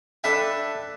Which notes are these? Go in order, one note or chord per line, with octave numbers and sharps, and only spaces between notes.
D4 A4 B4 E5 G5